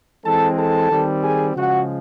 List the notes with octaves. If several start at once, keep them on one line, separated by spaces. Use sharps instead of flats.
E3 G#3 C4 A4 A5
A4 A5
D#3 G3 C4
G#4 G#5
C#3 F3 G#3 F#4 F#5